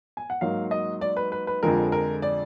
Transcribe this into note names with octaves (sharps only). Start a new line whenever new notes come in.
G#5
F#5
G#2 F#3 A#3 F5
D#5
D5
B4
B4
B4
F2 D3 F3 G#3 A#4
A#4
D5